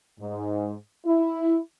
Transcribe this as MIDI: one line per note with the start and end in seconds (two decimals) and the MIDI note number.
0.20 0.73 44
1.05 1.58 64